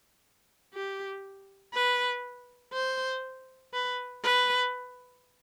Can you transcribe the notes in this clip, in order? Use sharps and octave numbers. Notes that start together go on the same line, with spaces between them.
G4
B4
C5
B4
B4